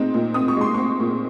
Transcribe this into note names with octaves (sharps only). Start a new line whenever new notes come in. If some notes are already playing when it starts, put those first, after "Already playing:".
Already playing: A#2 G#3 C4 D#4
A#2
C4 D#6
C#6
G#3 C6
C4 C#6
A#2